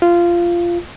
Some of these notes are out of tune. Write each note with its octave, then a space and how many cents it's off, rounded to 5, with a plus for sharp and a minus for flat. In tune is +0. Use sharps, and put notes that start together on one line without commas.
F4 -15